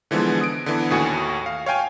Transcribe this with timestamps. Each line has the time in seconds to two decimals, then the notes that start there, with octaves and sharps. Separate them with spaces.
0.11 D3 E3 F3 G#3 B3
0.41 D#6 D7
0.66 D3 E3 B3
0.90 D#2 A2 F#4 G#5 C#7
1.46 F5
1.66 C#5 F5 G5 G#5